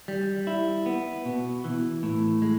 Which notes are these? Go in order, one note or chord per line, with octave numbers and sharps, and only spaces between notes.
G3
E4
B3
B2
E3
A2
G#3